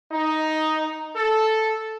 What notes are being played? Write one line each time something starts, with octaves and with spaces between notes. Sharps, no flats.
D#4
A4